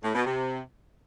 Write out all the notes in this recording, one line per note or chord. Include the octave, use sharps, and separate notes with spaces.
A2
B2
C3